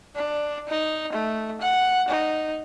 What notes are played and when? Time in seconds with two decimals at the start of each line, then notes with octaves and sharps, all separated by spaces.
0.15 D4
0.69 D#4
1.13 A3
1.61 F#5
2.08 D#4